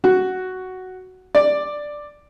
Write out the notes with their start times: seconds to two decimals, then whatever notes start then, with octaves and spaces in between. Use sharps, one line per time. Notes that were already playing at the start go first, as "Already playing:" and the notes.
0.04 F#4
1.35 D5